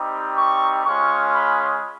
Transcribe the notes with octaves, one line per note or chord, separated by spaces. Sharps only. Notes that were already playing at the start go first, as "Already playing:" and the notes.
Already playing: G3 C4 D#4 G4
C#6
G#3 C#4 F4 C#6
B5